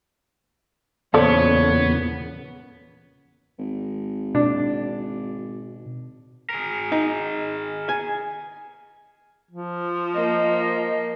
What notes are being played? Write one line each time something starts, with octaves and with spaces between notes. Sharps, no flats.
E2 A#2 C#3 F3 B3 A4 C#5 D5
G#1
B2 D4
G#4 A#4
D#4
G#5
F3
A#3 D#5